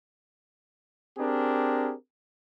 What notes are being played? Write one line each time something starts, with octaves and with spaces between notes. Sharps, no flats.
C4 D4 G4 G#4 A#4